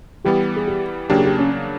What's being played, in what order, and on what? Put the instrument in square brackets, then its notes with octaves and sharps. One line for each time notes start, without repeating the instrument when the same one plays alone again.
[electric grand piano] E3 G3 B3 [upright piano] G4
[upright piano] G#4
G4
[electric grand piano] C#3 F#3 A#3 D4 [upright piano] G4
[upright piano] G#4
G4
C#4